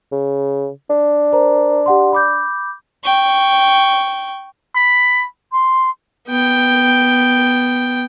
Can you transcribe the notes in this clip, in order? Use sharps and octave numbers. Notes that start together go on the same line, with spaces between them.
C#3
D4
A#4 C5 A#5
G4 F#5 C6
B5 D6 G6
G5 C#6
B5
C6
B3 G5